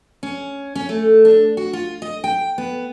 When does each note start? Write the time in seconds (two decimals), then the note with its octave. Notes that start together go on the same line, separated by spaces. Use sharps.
0.23 C#4
0.75 C#4
0.89 A3
1.25 D4
1.57 F#4
1.73 F4
2.02 D#5
2.24 G5
2.58 B3